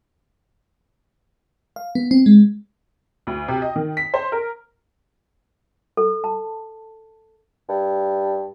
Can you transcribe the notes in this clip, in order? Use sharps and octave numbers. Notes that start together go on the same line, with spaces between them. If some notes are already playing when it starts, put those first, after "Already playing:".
F5
B3
C4
G#3
D2
C3
D#5
D#3
B6
C5
A#4
A4
A5
G2